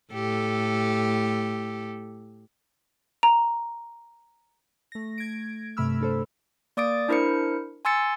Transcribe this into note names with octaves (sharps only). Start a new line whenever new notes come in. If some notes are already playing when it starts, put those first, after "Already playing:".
A2 G4 A4
A#5
A3 A#6
G#6 D7
G2 C3 A3 B5 E6 F6
D4 A4 C5
A#3 D5 D6 D#6 A6 D7
D4 E4 A#4 C5 C#7
G#5 C6 E6 A6 C#7